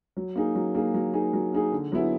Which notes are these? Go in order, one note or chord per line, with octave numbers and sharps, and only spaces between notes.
F#3
A#3 D#4 G#4
F#3
A#3 D#4 G#4
F#3
A#3 D#4 G#4
F#3
A#3 D#4 G#4
D3
F#3 B3 E4 G#4